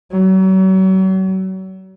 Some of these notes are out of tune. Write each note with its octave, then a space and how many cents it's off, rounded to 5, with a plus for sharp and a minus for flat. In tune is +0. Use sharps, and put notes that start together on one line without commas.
F#3 +40